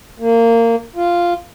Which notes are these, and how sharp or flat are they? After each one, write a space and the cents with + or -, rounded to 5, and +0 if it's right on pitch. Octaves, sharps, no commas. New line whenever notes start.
A#3 -20
F4 -5